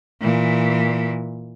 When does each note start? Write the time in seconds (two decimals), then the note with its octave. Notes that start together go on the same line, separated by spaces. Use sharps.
0.21 A#2 E3